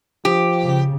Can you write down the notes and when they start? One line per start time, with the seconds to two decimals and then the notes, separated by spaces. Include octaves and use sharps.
0.25 F3 G4
0.63 C#3